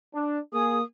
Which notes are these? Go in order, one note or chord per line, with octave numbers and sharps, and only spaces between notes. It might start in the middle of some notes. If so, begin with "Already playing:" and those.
D4
A#3 G#4 D#6